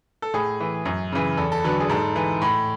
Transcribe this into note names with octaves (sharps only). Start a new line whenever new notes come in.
A4
A2 G#4
E3
F#2
C#3 E3
E2 A4
A4
D3 F#3 B4
G#4
G#2 A4
E3
A2